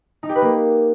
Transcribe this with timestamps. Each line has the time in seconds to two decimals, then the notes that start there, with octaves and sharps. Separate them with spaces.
0.23 D#4
0.29 G4
0.35 B4
0.42 A#3